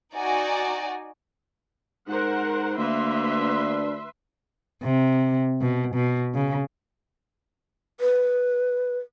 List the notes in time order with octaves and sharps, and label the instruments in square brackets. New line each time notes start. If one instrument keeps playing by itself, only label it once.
[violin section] D#4 F#4 D5 G#5
[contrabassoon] G#2 [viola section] A#4 C5 F#5
[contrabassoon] D2 [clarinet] A#3 [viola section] B4 E5 C6
[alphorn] D4
[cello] C3
B2
B2
C#3
[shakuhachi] B4